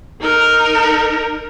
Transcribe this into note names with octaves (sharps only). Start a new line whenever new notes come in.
D#4 A#4